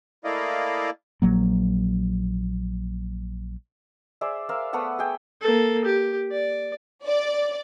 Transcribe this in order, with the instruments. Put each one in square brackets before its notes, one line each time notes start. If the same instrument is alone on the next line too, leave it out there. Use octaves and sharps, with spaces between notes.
[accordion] A3 A#3 E4 D5 D#5 F5
[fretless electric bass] A#1 F#3 A#3
[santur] G#4 C5 D5 E5
A#4 C5 E5 F5
A3 B3 B4 F#5
G#4 G5
[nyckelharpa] A#3 A4
G4
D5
[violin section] D5